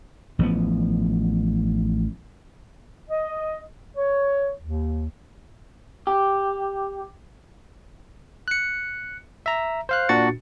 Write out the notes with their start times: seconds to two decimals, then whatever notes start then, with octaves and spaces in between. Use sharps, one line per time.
0.39 A1 F3 F#3 B3
3.10 D#5
3.97 C#5
4.61 D#2
6.07 G4
8.48 F#6 C#7
9.46 E5 A#5
9.89 C5 F5 F#6
10.09 A#2 D4 F#4 A6 C#7